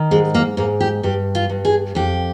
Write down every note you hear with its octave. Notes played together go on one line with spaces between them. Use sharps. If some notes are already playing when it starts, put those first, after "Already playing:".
Already playing: D#3
G#2 G#3
A#3
G#2 A#3
G4
G2 G4
F4
G2
G#4
F2 G4